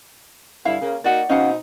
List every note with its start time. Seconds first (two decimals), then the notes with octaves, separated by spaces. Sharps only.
0.65 G2 D3 E4 F5
0.81 C#3 A#3
1.04 A#3 D#4 F#4 D5 F#5
1.30 B2 C4 C#4 D#4 F5 F#5